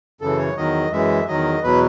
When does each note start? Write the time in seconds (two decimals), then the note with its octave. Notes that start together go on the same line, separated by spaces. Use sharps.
0.21 F#2 C#3 E3 A4
0.38 C#5
0.57 E2 D#3 F#3 D#5
0.92 F#2 E3 G#3 E5
1.28 E2 D#3 F#3 D#5
1.63 E2 B2 F#3 B4